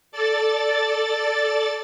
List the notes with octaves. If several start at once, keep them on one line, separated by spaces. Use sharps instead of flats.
A4 D5 A6